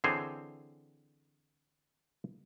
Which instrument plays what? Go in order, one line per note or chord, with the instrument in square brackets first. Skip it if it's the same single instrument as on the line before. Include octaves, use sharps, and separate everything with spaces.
[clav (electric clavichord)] D3 E3 C4 G#4 C5 C#5